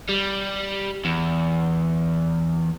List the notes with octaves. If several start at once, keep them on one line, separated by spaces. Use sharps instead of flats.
G3
E2